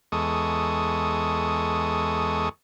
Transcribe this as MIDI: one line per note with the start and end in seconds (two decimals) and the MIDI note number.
0.12 2.49 40
0.12 2.49 56
0.12 2.49 69
0.12 2.49 85
0.12 2.49 87